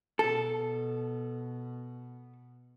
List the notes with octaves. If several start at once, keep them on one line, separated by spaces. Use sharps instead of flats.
B2 A4